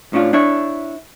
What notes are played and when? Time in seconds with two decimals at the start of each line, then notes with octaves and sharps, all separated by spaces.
0.13 A2 C#4 D4 F4
0.33 D4 E4 C#5